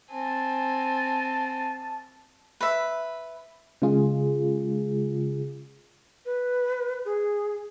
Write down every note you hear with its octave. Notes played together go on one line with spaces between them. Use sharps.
C4 G#5 A5
B4 E5
C#3 G#3 F4 G#4
B4
G#4